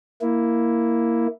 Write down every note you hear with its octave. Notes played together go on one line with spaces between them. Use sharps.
A#3 E4